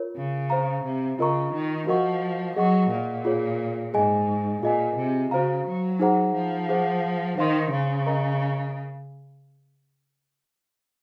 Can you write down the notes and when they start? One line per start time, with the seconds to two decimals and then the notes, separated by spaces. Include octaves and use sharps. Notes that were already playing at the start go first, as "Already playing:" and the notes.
Already playing: F4 A#4 C#5
0.16 C#3
0.50 C5 F5 A#5
0.84 C3
1.18 C#3 F4 A#4 D#5 A#5 C#6
1.53 D#3
1.87 F3 F#4 A#4 D#5 F#5 C#6
2.56 F#3 G#4 D#5 F#5 C#6
2.90 A#2
3.25 F4 G#4 C#5
3.93 G#2 G#4 D#5 G#5
4.62 A#2 F4 G#4 D#5 G#5
4.97 C3
5.31 C#3 F#4 C5 F5 A#5
5.66 F#3
5.99 D#4 G#4 C5 F#5 A#5
6.34 F3
6.69 G#4 C5 F#5
7.38 D#3 C5 F5 C6
7.72 C#3
8.06 A#4 D#5 A#5